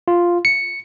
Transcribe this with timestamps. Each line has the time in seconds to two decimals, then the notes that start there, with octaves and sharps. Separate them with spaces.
0.08 F4
0.45 C#7